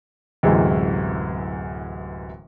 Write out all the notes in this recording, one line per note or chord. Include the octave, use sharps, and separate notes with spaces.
D1 F#2 C3 E3 G#3